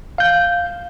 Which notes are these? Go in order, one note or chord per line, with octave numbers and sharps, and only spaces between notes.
F5 G6